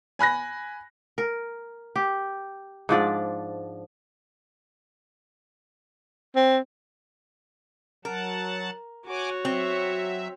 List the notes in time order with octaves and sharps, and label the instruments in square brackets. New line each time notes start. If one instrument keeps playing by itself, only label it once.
[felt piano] G#5 B5 F#6 A#6
[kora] A#4
G4
G#2 F3 D4 D5
[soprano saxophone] C4
[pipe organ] F#3 F#5 A5 [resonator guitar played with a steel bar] A#4
[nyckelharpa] F#4 C#5 [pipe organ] F#5 G#5 D6
[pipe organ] F#3 E5 [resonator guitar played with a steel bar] C4